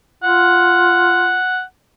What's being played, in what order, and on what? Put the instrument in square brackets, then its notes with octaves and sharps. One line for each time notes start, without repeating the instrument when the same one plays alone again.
[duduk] F4 [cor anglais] F#5